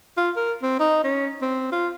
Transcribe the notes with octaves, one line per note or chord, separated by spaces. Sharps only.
F4
A#4
C4
D#4
C#4
C4
F4